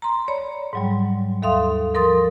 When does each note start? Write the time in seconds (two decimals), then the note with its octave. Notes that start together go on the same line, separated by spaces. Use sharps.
0.02 A#5 C6
0.28 C#5 D5 B5
0.73 G#2 F#3 G3
1.42 D#2 A4 E5 F5 C6 D#6
1.94 F3 A#4 C6 D#6 A6